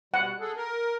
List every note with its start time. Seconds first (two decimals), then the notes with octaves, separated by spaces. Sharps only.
0.14 B2 G3 F#5
0.40 G#4 A4
0.56 A#4